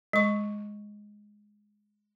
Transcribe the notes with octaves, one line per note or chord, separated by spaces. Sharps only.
G#3 C#6